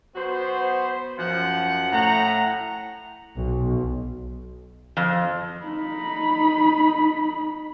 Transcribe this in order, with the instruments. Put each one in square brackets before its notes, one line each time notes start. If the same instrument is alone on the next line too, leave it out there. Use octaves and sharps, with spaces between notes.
[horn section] F#3 B3 F#4 C5
F#2 F3 F#5
A2 F#5 A#5
[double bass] B1
[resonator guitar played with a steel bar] F2
[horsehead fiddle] D#4 B5